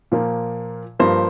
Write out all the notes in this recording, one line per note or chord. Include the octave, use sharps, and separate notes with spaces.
A#2 F3 A#3
G2 F3 A#3 C5